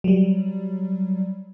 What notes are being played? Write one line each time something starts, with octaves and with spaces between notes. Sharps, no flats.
F#3 G3